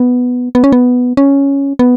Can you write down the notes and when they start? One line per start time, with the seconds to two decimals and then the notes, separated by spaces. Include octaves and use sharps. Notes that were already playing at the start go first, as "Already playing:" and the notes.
Already playing: B3
0.55 B3
0.64 C#4
0.72 B3
1.17 C#4
1.79 B3